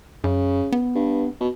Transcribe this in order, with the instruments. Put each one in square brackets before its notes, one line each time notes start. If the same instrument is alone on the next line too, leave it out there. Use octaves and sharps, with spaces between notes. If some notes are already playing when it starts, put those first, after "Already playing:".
[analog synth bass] F#2 [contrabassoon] C#3
[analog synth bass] B3
[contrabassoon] G2
B2